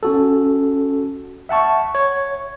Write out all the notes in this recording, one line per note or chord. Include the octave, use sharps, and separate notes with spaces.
C#4 F#4 A4
E5 F#5 A5 C#6
C#5